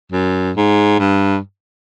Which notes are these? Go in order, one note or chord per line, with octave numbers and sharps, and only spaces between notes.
F#2
G#2
G2